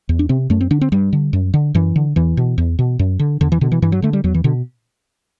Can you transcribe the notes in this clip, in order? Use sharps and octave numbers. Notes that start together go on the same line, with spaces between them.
E2
D4
C3 C4
F#2 A3
C4
D3 D4
C4
G2 G3
D3
F#2
D3
F#2 E3
D3
E2 E3
B2
E2
B2
F#2
D3
E2 D3
E3
B2 D3
E3
G2 E3
F#3
D3 A3
G3
E2 F#3
E3
B2 D3